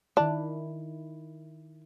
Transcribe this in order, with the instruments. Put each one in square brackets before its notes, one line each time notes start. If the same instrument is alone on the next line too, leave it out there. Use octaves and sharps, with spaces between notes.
[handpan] D#3 E4 [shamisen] D4